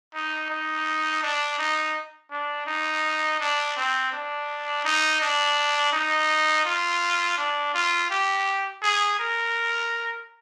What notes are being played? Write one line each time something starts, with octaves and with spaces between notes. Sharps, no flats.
D#4
D#4
D4
D#4
D4
D#4
D4
C4
D4
D#4
D4
D#4
F4
D4
F4
G4
G#4
A#4